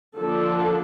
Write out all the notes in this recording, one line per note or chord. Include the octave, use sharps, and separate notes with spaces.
D3 F3 A#3 D4 A4